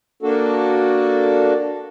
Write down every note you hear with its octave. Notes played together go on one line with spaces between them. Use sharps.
A#3 D4 F#4 A4